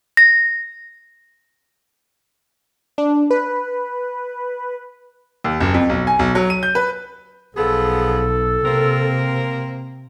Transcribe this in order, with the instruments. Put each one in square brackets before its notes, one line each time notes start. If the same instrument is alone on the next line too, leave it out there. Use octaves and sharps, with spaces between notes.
[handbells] A#6
[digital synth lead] D4
B4
[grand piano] D#2
F#1
F2
B1
G#5
B1
F#3
D#7
G6
B4
[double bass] B1 [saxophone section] F3 B3 G#4 [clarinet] A4
[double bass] C3 [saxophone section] A#3 C4 A#4